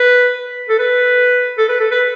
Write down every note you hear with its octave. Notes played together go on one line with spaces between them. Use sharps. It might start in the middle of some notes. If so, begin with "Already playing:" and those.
Already playing: B4
A4
B4
A4
B4
A4
B4